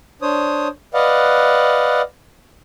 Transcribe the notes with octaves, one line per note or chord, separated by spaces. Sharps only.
D4 C5 C#5 D#6
B4 D5 D#5 F5 F#5